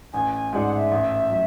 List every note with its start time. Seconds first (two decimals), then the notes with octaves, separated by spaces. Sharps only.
0.13 A1 G#5
0.33 G#5
0.52 G#2 G#3 D4 F#5 G#5
0.72 F#5
0.77 E5
0.91 A1
1.30 F#3